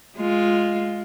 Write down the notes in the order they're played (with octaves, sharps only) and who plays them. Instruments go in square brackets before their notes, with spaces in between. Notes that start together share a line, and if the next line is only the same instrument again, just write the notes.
[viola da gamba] G#3 F4